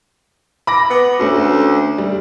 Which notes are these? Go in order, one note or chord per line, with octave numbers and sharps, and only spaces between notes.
B5 D6 A#6
B3
D2 A3 C#4 F#4
G3